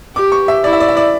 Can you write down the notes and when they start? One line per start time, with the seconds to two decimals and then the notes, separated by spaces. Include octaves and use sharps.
0.16 G4 D6
0.32 C#6
0.48 E5
0.64 E4 D5
0.73 E5
0.80 D5
0.88 E5
0.97 D5